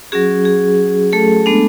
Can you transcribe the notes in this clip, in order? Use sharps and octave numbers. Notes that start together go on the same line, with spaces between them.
F#3 C#4 F#4 G#4
G#4
A3 A4
G#3 B3 D4